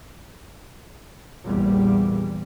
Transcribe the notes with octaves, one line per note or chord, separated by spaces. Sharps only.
A#1 E2 A#2 G3